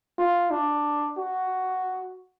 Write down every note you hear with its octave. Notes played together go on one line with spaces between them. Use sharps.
F4
D4
F#4